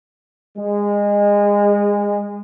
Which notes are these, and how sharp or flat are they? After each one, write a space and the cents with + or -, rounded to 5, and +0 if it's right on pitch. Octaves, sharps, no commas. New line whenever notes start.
G#3 -25